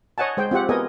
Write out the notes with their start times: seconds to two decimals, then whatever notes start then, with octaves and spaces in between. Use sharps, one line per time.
0.18 C#5 D#5 F#5 G#5 A5
0.37 G#3 C5 G5
0.51 C4 F4 G4 F#5
0.69 B3 G#4 A#4 D#5 F#5 G#5